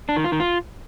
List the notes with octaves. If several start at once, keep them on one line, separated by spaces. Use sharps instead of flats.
D4
D#3
F4
D#3
F4